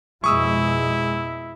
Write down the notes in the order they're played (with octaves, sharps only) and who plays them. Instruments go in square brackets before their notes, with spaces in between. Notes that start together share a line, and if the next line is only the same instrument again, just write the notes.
[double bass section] F2 B2 G#3 [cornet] E4 [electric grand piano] C#6 D#6 E6